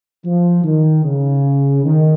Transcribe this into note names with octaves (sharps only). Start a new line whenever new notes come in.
F3
D#3
C#3
D#3